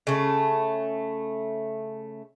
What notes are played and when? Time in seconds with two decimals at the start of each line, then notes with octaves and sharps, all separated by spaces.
0.07 C#3 A3